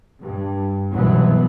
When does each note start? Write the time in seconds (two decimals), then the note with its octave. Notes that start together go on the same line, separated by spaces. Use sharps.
0.22 G2
0.93 F#1 C2 B2 E3 F#3 B3